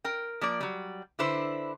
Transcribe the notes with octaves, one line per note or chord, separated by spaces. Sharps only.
A#4 G5
F3 A#3 D5
F#3 G3
D3 D4 E4 B4 C5